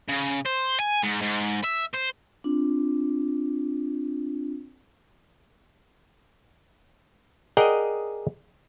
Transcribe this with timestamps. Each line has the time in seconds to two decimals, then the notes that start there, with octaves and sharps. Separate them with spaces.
0.09 C#3
0.46 C5
0.80 G#5
1.03 G#2
1.22 G#2
1.64 E5
1.94 C5
2.44 C4 D4 F4
7.57 G#4 A#4 D5 D#5 F#5 G5